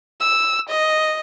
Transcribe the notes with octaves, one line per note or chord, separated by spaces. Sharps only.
E6
D#5